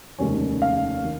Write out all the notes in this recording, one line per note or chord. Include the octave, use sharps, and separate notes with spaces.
F1 D#2 C#3 G#3 C#4
F5
D#3